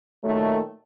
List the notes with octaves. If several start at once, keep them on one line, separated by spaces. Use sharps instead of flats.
A#2 D#3 F#3 A3